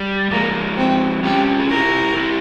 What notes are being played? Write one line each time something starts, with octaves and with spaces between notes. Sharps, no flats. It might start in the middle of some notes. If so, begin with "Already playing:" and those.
Already playing: G3
F3 G#3 A#3
C4
C#4 F4 G4
G#4
E4 G4 A#4
E4 G4